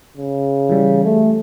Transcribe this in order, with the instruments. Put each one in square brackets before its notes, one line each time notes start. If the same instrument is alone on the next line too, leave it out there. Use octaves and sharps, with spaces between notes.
[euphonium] C#3
[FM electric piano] E3 G3
[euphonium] A3